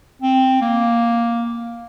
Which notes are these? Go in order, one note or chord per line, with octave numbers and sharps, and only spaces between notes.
C4
A#3